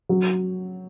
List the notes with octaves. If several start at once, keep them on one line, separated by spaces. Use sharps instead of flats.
F#3